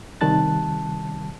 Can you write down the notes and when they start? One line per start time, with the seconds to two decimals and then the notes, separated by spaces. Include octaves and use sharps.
0.21 C3 D#3 G3 A5 F#6 A6